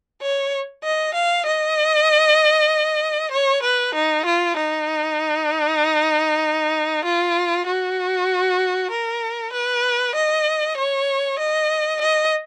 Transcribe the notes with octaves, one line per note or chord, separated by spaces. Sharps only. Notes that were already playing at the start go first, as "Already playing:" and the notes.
C#5
D#5
F5
D#5
C#5
B4
D#4
F4
D#4
F4
F#4
A#4
B4
D#5
C#5
D#5
D#5